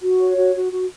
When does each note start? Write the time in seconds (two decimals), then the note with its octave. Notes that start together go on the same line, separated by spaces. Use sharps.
0.02 F#4
0.19 C#5
0.36 F#4
0.54 F#4
0.72 F#4